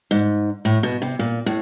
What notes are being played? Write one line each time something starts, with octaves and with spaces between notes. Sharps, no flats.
G#2
A2
B2
C3
A#2
A2